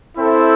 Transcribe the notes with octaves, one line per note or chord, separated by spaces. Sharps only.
C4 E4 A4 C5 E5